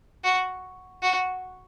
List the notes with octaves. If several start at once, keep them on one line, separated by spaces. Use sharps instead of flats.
F#4
F#4